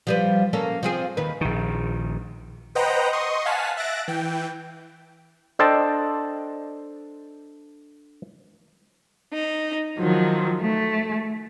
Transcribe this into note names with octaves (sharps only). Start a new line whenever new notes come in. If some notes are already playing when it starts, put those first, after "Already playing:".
F3 G3 B4
A#3 C#4 A4
F3 C4 G#4
D#2 D#3 B4
A#1 D#3
B4 C5 D#5 F#5 G5 A#5
D#5 C6 C#6 D#6
F5 F#5 G#5 A5 B6
E5 F#6 A6 A#6 D7
E3 G5
D4 A4 C5 D#5 G5 A5
D#4
D#3 F3 F#3
A3